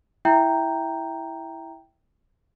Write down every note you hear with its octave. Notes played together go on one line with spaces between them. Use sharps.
E4 E5 G5 A#5 G6